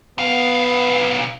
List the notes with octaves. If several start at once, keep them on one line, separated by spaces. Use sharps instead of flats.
B1 B3 F5